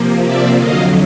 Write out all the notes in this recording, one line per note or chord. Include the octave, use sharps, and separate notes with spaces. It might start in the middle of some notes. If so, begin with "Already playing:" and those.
Already playing: C3 F3 A#3
D5 E5
F2 D3 F#3 D#5 F5